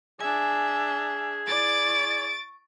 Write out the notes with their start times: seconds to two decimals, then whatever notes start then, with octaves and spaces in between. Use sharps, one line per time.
0.21 D4 G#4 E5 G#5
1.48 E4 D5 A6 D7
1.86 C#6